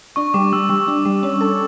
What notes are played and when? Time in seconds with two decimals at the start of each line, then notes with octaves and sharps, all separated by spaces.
0.16 D4 C#6
0.34 G3 D6
0.53 G3 E6
0.69 G3 C#6
0.88 D4
1.05 G3
1.23 C#4
1.41 A4